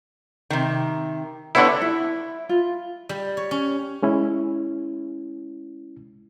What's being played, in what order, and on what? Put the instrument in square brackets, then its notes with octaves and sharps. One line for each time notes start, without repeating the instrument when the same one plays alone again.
[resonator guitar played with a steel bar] C3 D#3
[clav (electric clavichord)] D3 E4 [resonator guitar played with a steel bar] G3 B3 C#5
[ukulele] E4
F4
[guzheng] G3
C#5
C#4
[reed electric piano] G#3 C#4 E4